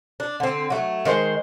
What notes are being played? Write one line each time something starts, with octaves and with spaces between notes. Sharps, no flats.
D4
D3 C4
F#3 A3
D#3 G#3 C5